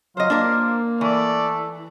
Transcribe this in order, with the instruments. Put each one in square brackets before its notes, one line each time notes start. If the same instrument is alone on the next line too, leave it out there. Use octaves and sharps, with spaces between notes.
[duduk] F#3 [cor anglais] F4 [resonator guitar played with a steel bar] C5 D#5
[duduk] A#3 [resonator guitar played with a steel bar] D4 A#4 C5
[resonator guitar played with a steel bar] E3 [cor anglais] A3 [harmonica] D5